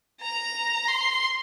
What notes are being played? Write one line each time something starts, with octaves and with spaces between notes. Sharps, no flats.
A#5
C6